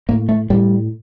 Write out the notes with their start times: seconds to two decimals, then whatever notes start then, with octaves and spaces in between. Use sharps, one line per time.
0.09 A2 A#3
0.29 A3
0.50 A2 G3